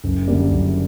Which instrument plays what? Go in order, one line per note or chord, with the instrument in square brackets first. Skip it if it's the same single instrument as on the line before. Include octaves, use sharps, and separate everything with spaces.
[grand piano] F#1
F#2 D3 G3 A#3
F#1